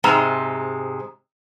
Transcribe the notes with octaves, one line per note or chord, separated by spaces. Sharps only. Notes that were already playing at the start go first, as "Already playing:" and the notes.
G#2 C3 G#3 A#5